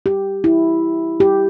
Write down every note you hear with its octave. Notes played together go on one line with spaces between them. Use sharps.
G4
E4
G4